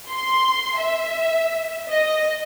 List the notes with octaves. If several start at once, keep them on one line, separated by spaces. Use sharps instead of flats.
C6
E5
D#5